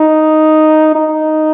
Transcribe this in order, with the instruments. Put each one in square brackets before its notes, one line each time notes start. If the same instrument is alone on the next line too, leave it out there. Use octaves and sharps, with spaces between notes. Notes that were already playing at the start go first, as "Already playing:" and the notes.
Already playing: [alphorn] D#4
D#4